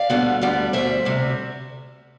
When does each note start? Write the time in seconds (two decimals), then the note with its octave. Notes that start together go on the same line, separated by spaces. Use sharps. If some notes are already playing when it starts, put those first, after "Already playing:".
Already playing: D5 F5
0.10 D2 D3 G3 B3
0.42 D2 D3 G3 B3
0.73 D2 C3 G3 C5 E5
1.05 D2 C3 G3